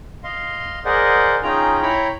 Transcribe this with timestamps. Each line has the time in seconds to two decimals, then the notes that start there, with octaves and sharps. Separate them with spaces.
0.24 D#5 F5 C6
0.85 G#4 A#4 C5 D5 D#5 F#5
1.43 C#4 D#4 F4 G#4 G5 A#5
1.82 E4 C#5 G5 A#5 B5